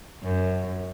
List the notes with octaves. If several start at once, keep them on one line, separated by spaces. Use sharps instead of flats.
F#2